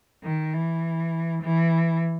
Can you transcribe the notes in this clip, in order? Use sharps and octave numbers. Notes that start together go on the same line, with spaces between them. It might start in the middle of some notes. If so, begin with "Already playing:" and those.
D#3
E3
E3